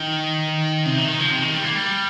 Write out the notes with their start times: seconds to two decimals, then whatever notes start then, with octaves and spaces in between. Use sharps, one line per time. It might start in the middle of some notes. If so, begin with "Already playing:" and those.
Already playing: D#3
0.85 C3
0.97 D#3
1.08 D#3
1.19 F3
1.30 C3
1.42 D#3
1.53 G3
1.64 A#3
1.75 G3